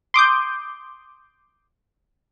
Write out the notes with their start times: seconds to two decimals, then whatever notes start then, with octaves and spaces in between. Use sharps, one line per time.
0.14 C6 D6 D#6 G6